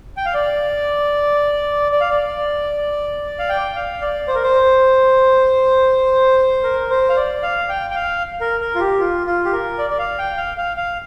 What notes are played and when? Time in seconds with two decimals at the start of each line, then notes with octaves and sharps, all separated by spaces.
0.17 G5
0.25 F5
0.34 D5
1.92 D5
2.01 F5
2.10 D5
3.39 F5
3.49 G5
3.75 F5
4.02 D5
4.28 C5
4.35 A#4
4.43 C5
6.64 A#4
6.90 C5
7.09 F5
7.16 D5
7.42 F5
7.69 G5
7.91 G5
7.95 F5
8.41 A#4
8.61 A#4
8.75 F4
8.80 G4
8.99 F4
9.27 F4
9.45 G4
9.53 A#4
9.78 D5
9.90 D5
9.99 F5
10.19 G5
10.37 F5
10.57 F5
10.77 F5